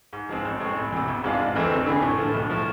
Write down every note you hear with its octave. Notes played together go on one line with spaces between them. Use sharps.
G#2
F3 G#3 C4
A1
A2 G#3 C4 G#4
E1
E2 C3
G#1
G#2 G#3 D4 F4
F1
F2 E3 A3 C4
D2
D3 A3 E4 G#4
A2
F3 A3
B1
A2 F3